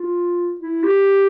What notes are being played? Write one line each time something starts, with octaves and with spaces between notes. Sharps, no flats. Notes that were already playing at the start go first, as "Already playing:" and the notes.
Already playing: F4
E4
G4